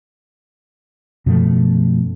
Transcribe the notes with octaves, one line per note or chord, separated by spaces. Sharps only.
F#2 B2 F3 A3